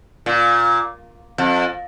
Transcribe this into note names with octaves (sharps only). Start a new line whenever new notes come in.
A#2
F2